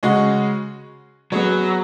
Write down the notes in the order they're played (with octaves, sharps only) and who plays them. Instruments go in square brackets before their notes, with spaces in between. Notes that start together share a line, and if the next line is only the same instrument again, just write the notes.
[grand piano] C#3 G#3 C#4 F#4
[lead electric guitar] F#3 [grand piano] B3 G#4 C#5